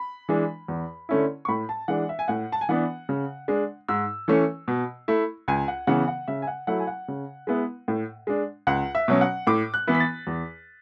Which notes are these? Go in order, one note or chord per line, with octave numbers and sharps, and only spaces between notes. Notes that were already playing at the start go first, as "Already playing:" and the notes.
Already playing: B5
E3 G#3 D4
E2
D3 A3 C#4 E4
C#6
A2 B5
A5
E3 G#3 D4 F#5
E5
G#5
A2 F#5
A5
G#5
E3 B3 D4 F#5
C#3
G#3 D4
G#2 E6
E3 A3 C#4
B2
A3 E4
C#2 G#5
F#5
C#3 E3 B3 F#5
F#5
C#3 E5
G#5
F#5
F#3 A3 E4 F#5
G#5
F#5
C#3
G#3 B3 E4
A2
G#3 D4
C#2 F#5
E5
B2 F#3 C#4
F#5
A2 D6
F#6
E3 B3 E4
B6
A6
E2